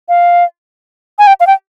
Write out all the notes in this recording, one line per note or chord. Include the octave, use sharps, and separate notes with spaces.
F5
G#5
G5
F5
G5